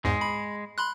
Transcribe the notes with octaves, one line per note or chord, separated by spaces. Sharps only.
E2 G#2 G#3
B5
B5 C6 F#6